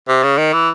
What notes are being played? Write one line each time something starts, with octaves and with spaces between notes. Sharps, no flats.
C3
C#3
D#3
E3